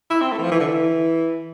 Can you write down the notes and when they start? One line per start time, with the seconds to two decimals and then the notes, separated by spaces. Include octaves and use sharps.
0.10 E4
0.21 C4
0.32 A3
0.39 E3
0.44 F3
0.52 E3
0.60 D3
0.68 E3